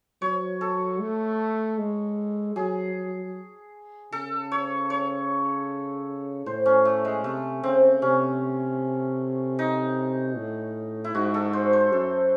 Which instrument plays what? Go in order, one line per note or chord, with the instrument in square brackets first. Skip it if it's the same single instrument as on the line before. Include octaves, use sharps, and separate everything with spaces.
[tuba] F#3 [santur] C#5
[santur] A4
[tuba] A3
G#3
[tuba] F#3 [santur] G#4
[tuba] C#3 [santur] A4
[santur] C#5
C#5
[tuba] A2 [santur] C5
[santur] C#4
A3
G#3
[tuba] C3 [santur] A3
[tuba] C#3 [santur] C4
[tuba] C3 [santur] C#4
[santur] D#4
[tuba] A2
[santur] E4
[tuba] G#2 [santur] F#4
[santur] A4
C5
C5
[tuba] F#2 [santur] A4